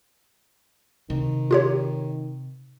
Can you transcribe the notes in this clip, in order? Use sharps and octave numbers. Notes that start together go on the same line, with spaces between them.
C3 D#3
F4 G4 C#5